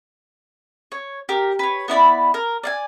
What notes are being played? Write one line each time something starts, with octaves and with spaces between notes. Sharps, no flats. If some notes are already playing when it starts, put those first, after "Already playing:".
C#5
G4 A#4
B4 C#5
B3 E4 D5 B5
A#4
D5 F5 G#5